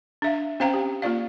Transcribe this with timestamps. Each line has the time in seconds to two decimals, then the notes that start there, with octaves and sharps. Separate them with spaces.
0.22 D4 E5 F5
0.60 C4 C#4 C5 F5 G5 A#5
0.74 G4
1.02 A#3 F4 D5 F5